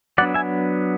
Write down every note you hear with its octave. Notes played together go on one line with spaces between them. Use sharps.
F#3 B3 D4 D5 F#5
E5 G#5